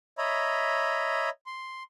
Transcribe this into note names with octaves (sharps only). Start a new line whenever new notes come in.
C#5 D#5 E5 A#5 B5
C6